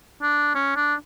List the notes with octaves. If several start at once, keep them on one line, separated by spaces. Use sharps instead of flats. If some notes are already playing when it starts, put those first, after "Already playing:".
D4
C#4
D4